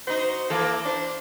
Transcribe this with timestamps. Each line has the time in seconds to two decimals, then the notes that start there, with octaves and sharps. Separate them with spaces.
0.07 D#4 F#4 C5
0.50 E3 A#3 A4
0.85 D4 C5